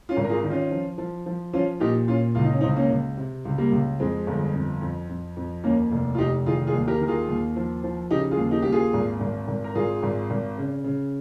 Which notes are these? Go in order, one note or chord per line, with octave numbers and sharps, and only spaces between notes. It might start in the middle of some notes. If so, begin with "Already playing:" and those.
C#4 F4
G#1
A#4
F4 G#4
D#3
C#4 F4
F3
F3
F3
F3 C#4 F4
A#2 D#4 G4
A#2 C#4 F4
C#2 F4
D#4
C#4
C4 D#4
C#2
A#3 C#4
C#2
C3
C#2
G3 A#3
C#2
F2 G#3 C4
G1
F2
F2
F2
F2
D#2 A#3 C#4
F1
F4
F1 D#4 G4
D#3 F4 G#4
F4 G#4
D#2
G4 A#4
D#3 A#4
F4 G#4
D#2
F3
F3
C#3 D#4 G4
F4 G#4
D#2
D#4 G4
D#2 G4
F4 G#4
G#1
G#1
G#1
A#4
G#1 F4 G#4
G#1
G#1
C#3
C#3